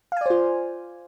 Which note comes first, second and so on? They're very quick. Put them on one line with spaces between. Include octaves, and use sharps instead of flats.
F5 G#5 D5 C5 F4